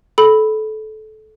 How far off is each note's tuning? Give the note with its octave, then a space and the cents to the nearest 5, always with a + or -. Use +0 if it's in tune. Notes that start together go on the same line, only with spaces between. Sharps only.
A4 -25 B5 +0